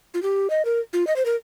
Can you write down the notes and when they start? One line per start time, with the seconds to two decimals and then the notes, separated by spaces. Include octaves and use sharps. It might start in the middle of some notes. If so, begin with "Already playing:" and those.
0.14 F4
0.22 G4
0.50 D#5
0.65 A#4
0.93 F4
1.07 D#5
1.16 C5
1.26 A#4